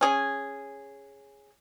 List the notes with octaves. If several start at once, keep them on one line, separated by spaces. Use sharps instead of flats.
C#4 G#4